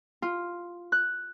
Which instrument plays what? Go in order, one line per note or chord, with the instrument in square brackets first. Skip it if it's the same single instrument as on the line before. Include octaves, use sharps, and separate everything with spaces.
[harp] F4
F#6